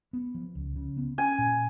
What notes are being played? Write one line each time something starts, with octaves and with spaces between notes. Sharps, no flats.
B3
F3
C#2
C#3
B3
C#4 G#5
A#2